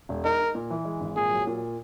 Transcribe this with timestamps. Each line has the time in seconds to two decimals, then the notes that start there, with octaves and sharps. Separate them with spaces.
0.09 E1
0.25 D#4 A#4
0.39 D#4
0.55 A#2
0.70 E3
0.85 G#3
1.00 G#1
1.16 A#2 G#4
1.31 F#3
1.47 A#2